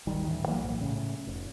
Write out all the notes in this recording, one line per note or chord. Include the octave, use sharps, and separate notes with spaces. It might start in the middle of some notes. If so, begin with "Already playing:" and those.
D#1 G#1 D#3 G3
A1 E3
E3 F#3 A#3
B1 A#2
A2 C#3
F1